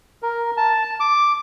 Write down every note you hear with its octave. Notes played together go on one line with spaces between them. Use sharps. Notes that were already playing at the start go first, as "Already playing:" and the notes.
A#4
A5
D6